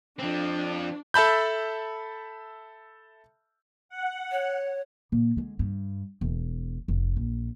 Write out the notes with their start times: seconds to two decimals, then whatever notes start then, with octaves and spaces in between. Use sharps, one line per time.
0.19 F3 C4 D4
1.14 A4 E5 A5 B5 G6
3.89 F#5
4.32 C#5
5.12 A#2
5.37 D3 G#3
5.59 G2
6.21 E1
6.88 F1
7.17 A#1